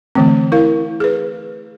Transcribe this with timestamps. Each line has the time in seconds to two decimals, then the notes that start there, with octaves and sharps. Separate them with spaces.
0.15 D3 E3 A3 C4
0.52 E4 A#4 F5
1.00 G#4 B4